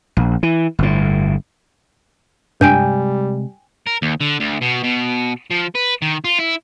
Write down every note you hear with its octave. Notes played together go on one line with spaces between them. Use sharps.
A#1
E3
G1 A2
G2 C3 G3 G#3 G5 G#5 G6
A#4
D#2
D3
D2
B2
B2
F3
B4
D#3
F4
E4